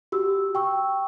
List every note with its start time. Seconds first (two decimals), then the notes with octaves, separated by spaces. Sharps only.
0.12 F#4 G4 E6
0.55 G5 C#6 E6